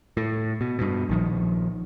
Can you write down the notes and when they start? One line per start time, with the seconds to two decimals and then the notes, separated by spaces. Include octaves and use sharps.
0.17 A2
0.61 B2
0.79 G2 B2
1.09 A#1 D#3 F3